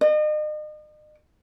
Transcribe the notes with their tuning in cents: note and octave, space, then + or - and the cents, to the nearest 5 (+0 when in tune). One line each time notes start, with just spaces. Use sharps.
D#5 -40